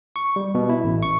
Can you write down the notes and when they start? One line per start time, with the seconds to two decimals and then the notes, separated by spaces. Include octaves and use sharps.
0.16 C#6
0.36 G3
0.55 B2
0.69 E4
0.84 A1
1.03 C#6